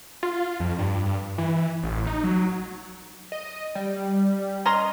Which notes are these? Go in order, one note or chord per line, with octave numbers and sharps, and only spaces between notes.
F4
F2
G2
E3
A1
D#4
F#3
D#5
G3
C#4 D#5 A#5 C6